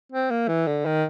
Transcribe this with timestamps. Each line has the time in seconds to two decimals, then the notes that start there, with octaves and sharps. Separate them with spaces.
0.12 C4
0.30 A#3
0.48 E3
0.67 D3
0.85 D#3